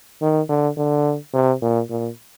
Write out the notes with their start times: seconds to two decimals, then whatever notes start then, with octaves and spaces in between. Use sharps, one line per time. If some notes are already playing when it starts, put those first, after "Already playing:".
0.21 D#3
0.49 D3
0.77 D3
1.33 C3
1.62 A#2
1.90 A#2